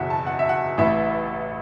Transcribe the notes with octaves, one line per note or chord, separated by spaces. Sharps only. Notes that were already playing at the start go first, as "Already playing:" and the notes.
Already playing: F#1 E2 B2 E5 F#5
A5
F#5
E5
F#5
A1 A2 E3 E5